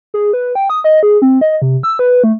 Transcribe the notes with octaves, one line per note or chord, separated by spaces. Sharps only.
G#4
B4
G5
D#6
D#5
G#4
C4
D#5
C3
E6
B4
A3